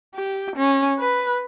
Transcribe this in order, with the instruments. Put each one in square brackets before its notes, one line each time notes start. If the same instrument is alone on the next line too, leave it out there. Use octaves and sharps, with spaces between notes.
[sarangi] G4
C#4
B4